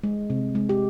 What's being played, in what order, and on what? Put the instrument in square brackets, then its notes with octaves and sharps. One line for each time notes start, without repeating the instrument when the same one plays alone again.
[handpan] G#3
C3
G#3
G4